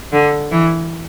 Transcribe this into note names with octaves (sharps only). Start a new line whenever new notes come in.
D3
E3